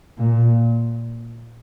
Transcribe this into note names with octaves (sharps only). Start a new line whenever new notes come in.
A#2